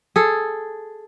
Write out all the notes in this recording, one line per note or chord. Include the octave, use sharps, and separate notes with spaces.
G#4 A4